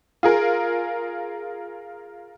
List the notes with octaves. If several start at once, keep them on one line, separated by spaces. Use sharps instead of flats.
F4 G#4 A#4